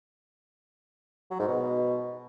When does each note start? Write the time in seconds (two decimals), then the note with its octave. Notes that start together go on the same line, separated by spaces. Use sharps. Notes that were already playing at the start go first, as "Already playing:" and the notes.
1.31 F#3
1.39 G#2
1.48 B2